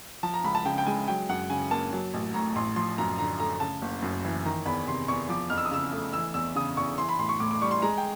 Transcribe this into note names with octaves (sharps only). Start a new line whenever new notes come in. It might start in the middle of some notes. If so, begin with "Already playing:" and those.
F3 A5
A#5
C#2 B5
A5
C#3 G5
G5
G#3 G#5
F#3 G5
F#2 F#5
C#3 G#5
A#3 A5
F#3
A1
A2 A#5
A1 C6
F3 C6
F#2 A#5
D3 A#5
A3 A#5
C#3 A5
F#1
F#2
E3
D#3 A#5
E2 B5
C3 C6
E2 C#6
F3 D6
F2 F6
E6
D#6
C#3 E6
A3
E3 E6
E2 E6
C#3 D#6
E2 C#6
E3 C6
B5
A1 C6
C#6
A2 D6
D6
G3 C#6
C6
G#3 A#5
G5